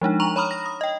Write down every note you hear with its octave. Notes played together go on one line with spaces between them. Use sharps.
F3 G#3 D4 D#4
A#5 C#6 F7 F#7
C#5 A#5 B5 D#6 F6
A#6
D#6
D#5 G5